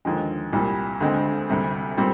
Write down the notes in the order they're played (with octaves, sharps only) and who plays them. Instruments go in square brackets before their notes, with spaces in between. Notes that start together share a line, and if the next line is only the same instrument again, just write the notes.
[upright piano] D#2 D3 F3 G#3
C2 A#2 G3
D2 D3 G#3 C4
D2 C3 G3
A#2 G3 C4